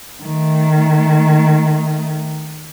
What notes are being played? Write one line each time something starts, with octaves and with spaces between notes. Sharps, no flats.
D#3 A3